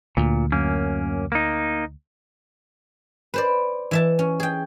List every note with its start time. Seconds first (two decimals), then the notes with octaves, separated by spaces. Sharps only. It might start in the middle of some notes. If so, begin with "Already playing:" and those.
0.17 D2 A#2
0.52 F#2 A#3 C#4
1.32 A#3 D#4
3.34 B4 C5 D5
3.91 E3 E5 A5
4.19 C#4
4.40 G#4 G5